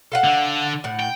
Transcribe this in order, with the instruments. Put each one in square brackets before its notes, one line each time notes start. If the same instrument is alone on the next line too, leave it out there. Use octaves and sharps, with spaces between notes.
[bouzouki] A4 F5 F#5
[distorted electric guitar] D3 D4
[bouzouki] A2 F#5
[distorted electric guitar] G5